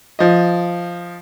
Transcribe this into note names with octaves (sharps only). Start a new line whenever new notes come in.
F3 D#5